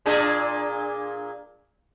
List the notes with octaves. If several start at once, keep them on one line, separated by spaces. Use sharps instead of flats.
A#2 D4 G#4